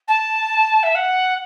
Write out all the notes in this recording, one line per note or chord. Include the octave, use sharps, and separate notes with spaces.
A5
E5
F#5